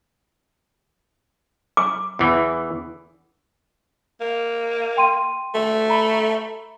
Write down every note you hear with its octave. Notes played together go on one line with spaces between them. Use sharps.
D6
E2 E3
A#3
G5 C6 D#7
A3
A#5 B5